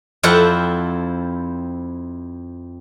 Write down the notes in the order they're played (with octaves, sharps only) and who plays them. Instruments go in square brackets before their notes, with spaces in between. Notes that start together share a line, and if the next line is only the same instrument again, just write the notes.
[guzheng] F2 C4 E4 F4 F#5 A5